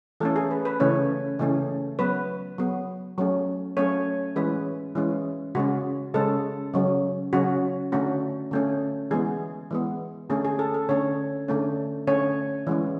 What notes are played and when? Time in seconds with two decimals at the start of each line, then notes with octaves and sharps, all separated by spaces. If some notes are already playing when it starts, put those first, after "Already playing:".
0.20 E3 A3 C#4 A4
0.36 G#4
0.51 B4
0.65 B4
0.80 C#3 E3 A3 C#4 C#5
1.39 C#3 E3 A3 C#4
1.99 F#3 B3 B4
2.58 F#3 B3
3.18 F#3 A3 C#4
3.77 F#3 A3 C#4 C#5
4.36 E3 G#3 C#4 B4
4.95 E3 G#3 C#4
5.55 C#3 G#3 C#4 F#4
6.14 C#3 G#3 C#4 A4
6.74 C#3 F#3 C#4
7.33 C#3 F#3 C#4 F#4
7.92 D3 A3 C#4 F#4
8.51 D3 A3 C#4
9.11 E3 G#3 B3 G#4
9.71 E3 G#3 B3
10.30 D3 A3 C#4 G#4
10.45 G#4
10.59 A4
10.74 A4
10.89 D3 A3 C#4 C#5
11.48 D3 A3 C#4
12.07 D3 A3 C#4 C#5
12.67 E3 G#3 C#4